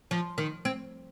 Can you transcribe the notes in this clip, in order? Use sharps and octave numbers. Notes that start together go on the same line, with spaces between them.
F3
D#3
C4